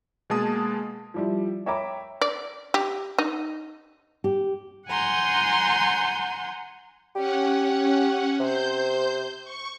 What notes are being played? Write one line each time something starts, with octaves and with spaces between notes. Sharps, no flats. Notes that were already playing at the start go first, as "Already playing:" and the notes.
B2 G#3 A#3 G#4 A5 D#6
F3 G3 E4
C#5 E5 G5 A#5 B5 D6
D5
G4
D#4
G4
F#5 G#5 A#5 C6 G6
C#4 G4 F#5
C3 C5 G6
C#6